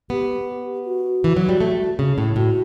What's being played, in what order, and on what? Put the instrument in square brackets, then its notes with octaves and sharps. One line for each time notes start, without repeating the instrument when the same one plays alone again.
[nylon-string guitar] B3 [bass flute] G4
[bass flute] F#4
[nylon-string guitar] E3
F#3
G3
A3
C#3
A2
[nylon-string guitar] A2 [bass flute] F#4